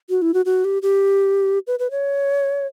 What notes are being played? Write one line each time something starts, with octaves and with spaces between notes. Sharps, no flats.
F#4
E4
F#4
F#4
G4
G4
B4
B4
C#5